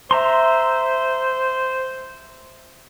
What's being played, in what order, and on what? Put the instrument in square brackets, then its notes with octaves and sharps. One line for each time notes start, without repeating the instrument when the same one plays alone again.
[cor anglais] C5 [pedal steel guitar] E5 A#5 C6